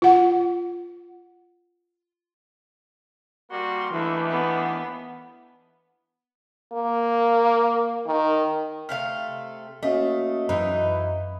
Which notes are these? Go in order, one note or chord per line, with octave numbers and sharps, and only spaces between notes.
F4 F#5
G3 A#3 F#4 C6
D#2 E3 A3 D4 E4 A4
B3
A#3
D#3
C3 A3 F5 F6
A3 A#3 C#4 F#4 D#5 F5
F#2 E3 D#4 B4